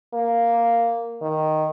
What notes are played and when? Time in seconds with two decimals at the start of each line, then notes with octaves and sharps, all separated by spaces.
0.14 A#3
1.22 D#3